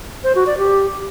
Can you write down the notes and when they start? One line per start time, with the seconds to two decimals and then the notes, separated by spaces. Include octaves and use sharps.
0.24 C5
0.35 F#4
0.47 D5
0.58 G4